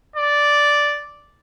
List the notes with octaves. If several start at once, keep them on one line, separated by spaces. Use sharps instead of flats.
D5